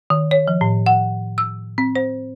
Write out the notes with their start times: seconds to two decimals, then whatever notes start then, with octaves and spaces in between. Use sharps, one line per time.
0.10 D#3
0.31 C#5
0.48 F3
0.61 A2
0.86 F#5
1.38 E6
1.78 C4
1.96 C5